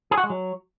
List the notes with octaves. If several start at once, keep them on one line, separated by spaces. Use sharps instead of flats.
G#4
F#4
G#3
F#3